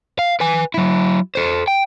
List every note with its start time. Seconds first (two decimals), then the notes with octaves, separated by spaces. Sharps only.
0.19 F5
0.40 B4 G#5
0.74 F#3 E4
1.35 A4 C5
1.68 G5